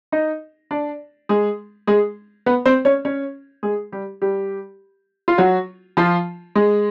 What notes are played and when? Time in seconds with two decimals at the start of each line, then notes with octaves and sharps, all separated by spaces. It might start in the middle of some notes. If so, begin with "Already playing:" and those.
0.12 D#4 D#5
0.71 D4 D5
1.29 G#3 G#4
1.87 G#3 G#4
2.46 B3 B4
2.66 C4 C5
2.85 C#4 C#5
3.05 C#4 C#5
3.63 G#3 G#4
3.92 G3 G4
4.22 G3 G4
5.28 F4
5.38 F#3 F#4
5.97 F3 F4
6.55 G#3 G#4